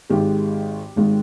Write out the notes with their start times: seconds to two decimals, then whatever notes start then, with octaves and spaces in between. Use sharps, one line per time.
0.10 G#1 G#2 D#3 G#3 G4
0.96 G#1 G#2 D#3 G#3